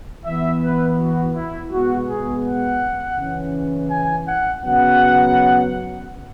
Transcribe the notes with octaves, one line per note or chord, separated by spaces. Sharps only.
E3 B3 E5
B4
F#4
E4
B2 G#3 B3 F#4
G#4
F#5
C#3 E3 C#4
G#5
F#5
C#3 F#3 B3 F#5